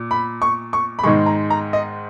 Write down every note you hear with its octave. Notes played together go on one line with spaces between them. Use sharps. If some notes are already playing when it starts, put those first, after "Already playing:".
Already playing: A#2
B5
C#6
C#6
B5
G#2 D#3 G#3 C#6
A#5
A#5
D#5